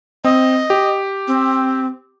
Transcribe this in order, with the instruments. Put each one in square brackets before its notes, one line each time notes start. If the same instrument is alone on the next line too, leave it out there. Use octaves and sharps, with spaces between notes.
[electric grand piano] C4 [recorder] D#5
[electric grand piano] G4
[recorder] C4